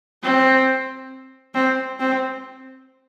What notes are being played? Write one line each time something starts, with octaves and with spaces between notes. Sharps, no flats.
C4
C4
C4